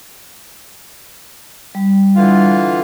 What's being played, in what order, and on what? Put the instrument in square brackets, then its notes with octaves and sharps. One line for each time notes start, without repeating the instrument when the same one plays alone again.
[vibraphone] G3
[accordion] D3 E3 F4